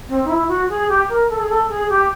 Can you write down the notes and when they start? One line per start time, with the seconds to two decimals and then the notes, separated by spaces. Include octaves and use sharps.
0.09 C4
0.25 D#4
0.29 E4
0.48 F#4
0.69 G#4
0.89 G4
1.09 A#4
1.30 A4
1.40 G#4
1.49 A4
1.69 G#4
1.89 G4